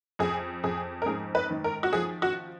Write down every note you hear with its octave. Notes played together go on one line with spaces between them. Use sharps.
F2 G#4
F2 G#4
A#4
G#2 G#4
B4
D#3
A#4
F#4
F3 G#4
F#4